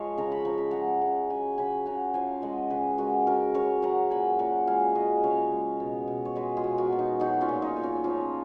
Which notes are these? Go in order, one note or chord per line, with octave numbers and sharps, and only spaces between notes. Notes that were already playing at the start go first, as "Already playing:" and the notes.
Already playing: F3 G#3 C#5 D#5 F5
C#3 A#5
B5
F3 A#5
B5
G#3 F#5 A#5
C#3
F#3 G#5 B5
C#3 G#5 B5
C#3 F#5 A#5
F3 F5 G#5
G#3 D#5 F#5
C#3 G#4 B4
G#3 F#4 A#4
C#3 F#4 A#4
C#3 A#4 C#5
F#3 F#5 A#5
A#2 G#5 B5
A#2 F#5 A#5
G#3 F5 G#5
C#3 D#5 F#5
C#3 C#5 F5
G#3
B2
B2
C#5
G#3 B4 D#5
F4 G#4
B2
F#4 A#4
B2
D#4
F#3 D#4 F#4
C#4 F4
A#2
D#4
A#2
C#4
F3 C#4 F4